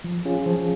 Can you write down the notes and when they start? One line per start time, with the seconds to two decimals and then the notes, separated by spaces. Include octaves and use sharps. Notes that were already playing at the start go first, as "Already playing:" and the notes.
0.04 F3
0.25 C#4 F4 G#4
0.46 F3